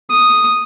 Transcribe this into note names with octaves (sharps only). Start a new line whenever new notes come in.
D#6